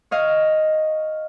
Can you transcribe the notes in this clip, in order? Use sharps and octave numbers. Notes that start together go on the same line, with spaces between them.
C#5 D#5 F5